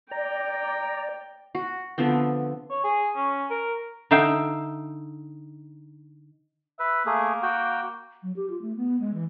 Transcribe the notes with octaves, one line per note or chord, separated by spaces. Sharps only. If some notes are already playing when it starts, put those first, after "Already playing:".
D5 G5 A#5
F#4
D3 F3 B3 C4
C#5
G#4
C#4
A#4
D3 D#4 E5 F5 G5
B4 E5
A3 A#3 G#4
F#4 G5
F#3
G4
F4
A3
B3
G#3
E3